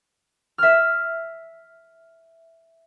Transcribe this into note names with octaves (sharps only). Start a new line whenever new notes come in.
E5 F6